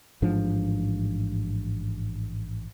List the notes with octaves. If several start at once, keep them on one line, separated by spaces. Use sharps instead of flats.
A1 G#2 F3 D4